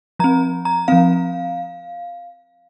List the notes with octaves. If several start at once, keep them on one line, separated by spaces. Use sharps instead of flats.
F3 C4 A#5
A#5
F3 C4 F5